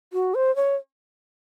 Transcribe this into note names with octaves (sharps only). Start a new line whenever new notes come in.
F#4
C5
C#5